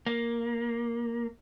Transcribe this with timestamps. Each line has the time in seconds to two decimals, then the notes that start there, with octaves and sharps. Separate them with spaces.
0.06 A#3